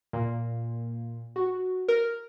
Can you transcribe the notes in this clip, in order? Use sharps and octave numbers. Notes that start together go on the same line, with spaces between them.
A#2
F#4
A#4